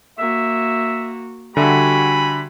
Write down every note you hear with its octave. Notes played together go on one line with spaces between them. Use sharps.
A#3 F#4 E5
D3 G3 F#4 E5 G#5 B5